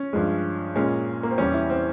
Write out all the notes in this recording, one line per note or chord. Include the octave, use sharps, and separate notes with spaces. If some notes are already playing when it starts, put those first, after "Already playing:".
Already playing: C#4
G2 F3 G#3
A#2 G#3 C#4
A#3
C4
E2 E3 G3 C#4
E4
C4